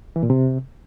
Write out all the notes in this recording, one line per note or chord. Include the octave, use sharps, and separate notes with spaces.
E3
A#2
C3